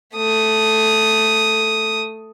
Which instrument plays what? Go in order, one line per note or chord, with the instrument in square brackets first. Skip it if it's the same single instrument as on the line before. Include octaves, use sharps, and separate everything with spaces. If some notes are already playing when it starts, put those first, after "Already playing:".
[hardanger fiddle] A3 D#6